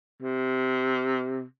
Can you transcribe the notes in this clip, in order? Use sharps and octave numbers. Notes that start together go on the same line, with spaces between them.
C3